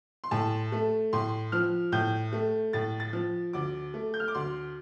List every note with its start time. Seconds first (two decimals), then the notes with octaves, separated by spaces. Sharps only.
0.24 C6
0.31 A2 A5
0.72 A3
1.13 A2 C6
1.52 F3 F6
1.92 A2 G6
2.33 A3
2.73 A2 A6
3.00 A6
3.13 F3
3.53 D2 D6
3.94 A3
4.14 G6
4.20 F6
4.28 D6
4.35 D2 C6